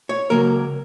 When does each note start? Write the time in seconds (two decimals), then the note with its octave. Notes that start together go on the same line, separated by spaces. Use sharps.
0.09 C#5
0.30 C#2 B2 F#3 A#3 A#4